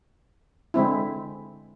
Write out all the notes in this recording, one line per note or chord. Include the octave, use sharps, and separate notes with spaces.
D3 G#3 C4 E4